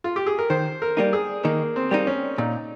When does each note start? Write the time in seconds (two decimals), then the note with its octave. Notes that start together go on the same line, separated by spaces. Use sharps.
0.04 F4
0.16 G4
0.27 G#4
0.38 A#4
0.50 D#3 C5
0.82 A#4
0.97 G3 A#3 D#4
1.13 G#4
1.44 D#3 A#3
1.76 C4
1.91 G3 A#3 D#4
2.07 C#4
2.38 A#2 D#4